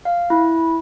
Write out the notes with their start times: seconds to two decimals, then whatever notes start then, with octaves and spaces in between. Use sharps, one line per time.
0.05 F5
0.30 E4